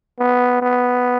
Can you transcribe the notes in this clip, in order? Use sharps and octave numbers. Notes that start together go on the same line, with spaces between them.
B3
B3